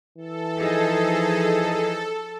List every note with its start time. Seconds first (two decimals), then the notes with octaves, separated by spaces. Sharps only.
0.18 E3 A4
0.59 F3 D#4 G#4